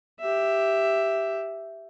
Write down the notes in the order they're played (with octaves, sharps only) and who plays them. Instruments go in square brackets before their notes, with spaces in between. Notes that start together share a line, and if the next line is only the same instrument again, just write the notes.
[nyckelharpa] G4 E5